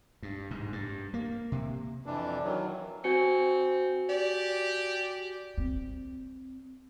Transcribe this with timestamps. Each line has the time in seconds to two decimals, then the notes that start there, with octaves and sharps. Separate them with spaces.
0.23 G2
0.51 G#2
0.73 G2
1.14 A#3
1.52 C3
2.06 F2 E3 D4
2.43 D#3 E3 F#3
3.04 C4 F#4 G#5 C#7
4.09 G4 D5
5.58 C4